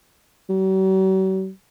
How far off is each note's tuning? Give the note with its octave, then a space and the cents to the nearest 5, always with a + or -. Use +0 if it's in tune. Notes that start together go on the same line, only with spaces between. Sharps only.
F#3 +45